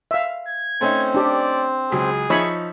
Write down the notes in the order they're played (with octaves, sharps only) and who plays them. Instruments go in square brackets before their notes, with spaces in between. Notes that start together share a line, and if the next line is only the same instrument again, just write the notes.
[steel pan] E5 F5
[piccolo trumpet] G#6
[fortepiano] A3 C#4 D#4 [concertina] C4 C5
[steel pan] D4 G4 [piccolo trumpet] D5
[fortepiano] C#2 F#3 [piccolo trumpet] G#4
[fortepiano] F3 D#4 E5 [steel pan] C#5 B5